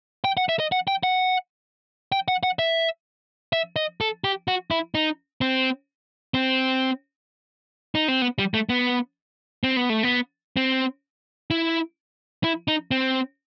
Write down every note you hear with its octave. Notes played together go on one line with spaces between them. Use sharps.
G5
F#5
E5
D#5
F#5
G5
F#5
G5
F#5
F#5
E5
E5
D#5
A4
G4
F#4
E4
D#4
C4
C4
D#4
C4
B3
G3
A3
B3
C4
B3
A3
B3
C4
E4
E4
D#4
C4